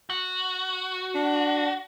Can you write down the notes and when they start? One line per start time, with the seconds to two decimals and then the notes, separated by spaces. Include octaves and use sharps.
0.10 F#4
1.15 D4